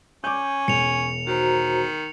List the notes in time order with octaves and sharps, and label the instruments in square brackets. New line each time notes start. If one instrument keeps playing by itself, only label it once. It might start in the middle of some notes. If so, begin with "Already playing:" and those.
[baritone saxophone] C#4 [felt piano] D6 G6
[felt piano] E1 [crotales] C#7 F7
[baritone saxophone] D#3 [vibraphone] F#4 C5 A#5